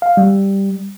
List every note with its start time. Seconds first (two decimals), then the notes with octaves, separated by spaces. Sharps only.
0.02 F5
0.17 G3